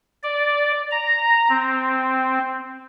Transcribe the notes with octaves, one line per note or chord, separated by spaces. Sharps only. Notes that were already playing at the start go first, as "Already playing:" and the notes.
D5
A#5
C4